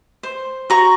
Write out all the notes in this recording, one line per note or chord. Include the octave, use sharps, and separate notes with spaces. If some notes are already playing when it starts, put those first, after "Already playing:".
C5
F#4 A#5 C#6